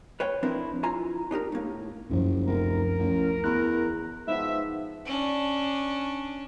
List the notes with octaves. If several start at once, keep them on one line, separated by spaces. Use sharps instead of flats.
B4 C#5 F5 G5
F3 C4 D4 E4 A#4 B4
E4 F4 G#5 A#5
D4 D#4 G4 A#4
A2 A#3
F#1 C#2 F#2 F3
F1 A#4
A1
E2 F#6
G#2 F3 B3 E5
C#4 D4